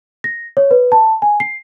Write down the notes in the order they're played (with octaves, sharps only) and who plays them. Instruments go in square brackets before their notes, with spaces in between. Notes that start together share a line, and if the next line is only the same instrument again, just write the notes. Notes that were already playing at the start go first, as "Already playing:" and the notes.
[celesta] A#6
C#5
B4
A5
G#5
C7